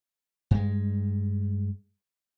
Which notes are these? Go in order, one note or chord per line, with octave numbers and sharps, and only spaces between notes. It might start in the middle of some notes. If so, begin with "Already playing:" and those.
G2 G#3